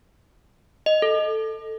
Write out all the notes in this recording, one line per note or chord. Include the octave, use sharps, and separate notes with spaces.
D#5
A4